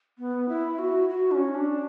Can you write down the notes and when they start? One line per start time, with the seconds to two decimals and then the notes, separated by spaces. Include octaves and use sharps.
0.19 B3
0.49 E4
0.79 F#4
1.09 F#4
1.31 D4
1.35 C#4
1.55 D4